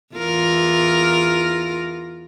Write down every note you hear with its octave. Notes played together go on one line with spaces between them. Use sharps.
E2 F4 A#4